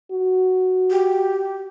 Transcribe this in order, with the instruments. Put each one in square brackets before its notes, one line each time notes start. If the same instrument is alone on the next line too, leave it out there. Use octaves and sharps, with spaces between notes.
[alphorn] F#4
[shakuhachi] G4